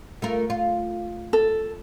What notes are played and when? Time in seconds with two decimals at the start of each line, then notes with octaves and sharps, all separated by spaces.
0.22 A3 F4 A#4
0.50 F4
1.33 A4